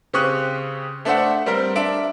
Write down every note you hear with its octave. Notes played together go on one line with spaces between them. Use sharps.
C#3 C4 G4 C#6 D#6 F#6
A3 D4 C5 E5 F#5
G3 C4 A#4 C5
D4 E5 D7